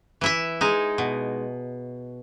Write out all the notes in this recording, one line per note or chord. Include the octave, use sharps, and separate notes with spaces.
E3 E4 E5
G#3 D#4
B2